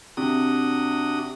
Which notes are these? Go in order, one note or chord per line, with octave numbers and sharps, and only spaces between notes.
C3 D4 F#4 D#6